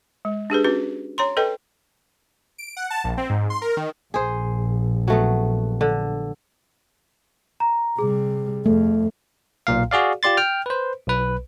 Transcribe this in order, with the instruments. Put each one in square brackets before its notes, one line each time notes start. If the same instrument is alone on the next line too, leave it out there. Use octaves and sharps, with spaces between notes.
[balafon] G#3
D4 G4 G#4 B4
C#4 F#4 B4
C#5 A#5 C6
A4 B4 D#5 G5
[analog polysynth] D7
F#5
A5
A#1
C4
G#2
C6
A#4
D#3
[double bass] A#1 [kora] G#4 C5
[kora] F#3 A3 B3
D3
[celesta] A#5
[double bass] C3 G3 [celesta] G#4
[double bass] F2 [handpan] A3
[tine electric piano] B1 A#2 F5
F#4 G#4 D5 F5
F4 G4 D5 C6 A6
G5 F6
B4 C5
B1 B4